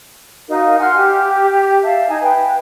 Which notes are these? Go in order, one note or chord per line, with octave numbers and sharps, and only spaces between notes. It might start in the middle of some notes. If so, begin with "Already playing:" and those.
D#4 F#4 A#4 F5
F#5 G#5 C6 F6
G4
E5 F5 A5
D#4 G#5
B4 G5